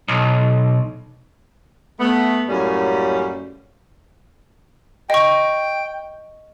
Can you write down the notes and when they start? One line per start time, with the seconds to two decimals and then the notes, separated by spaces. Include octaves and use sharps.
0.08 B1
2.00 A3 B3
2.48 F#2 A2 G3 A#3 C#4
5.10 D#5 G5 C#6